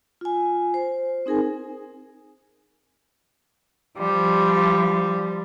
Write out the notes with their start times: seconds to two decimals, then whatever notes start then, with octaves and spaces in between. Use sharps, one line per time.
0.21 F4 G#5
0.74 C5
1.26 C4 D#4 G#4 A#4 G#5
3.98 F3 G3